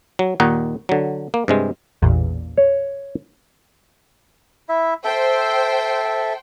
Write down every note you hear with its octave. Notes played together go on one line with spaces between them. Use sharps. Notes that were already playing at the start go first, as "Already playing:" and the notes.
F#3
D#2 A#2 D#3 D#4 F#5
D3 F#3
A#3
G2 C3 G#3
A1 E2 A#2
C#5
E4 E5
A4 C5 E5 G5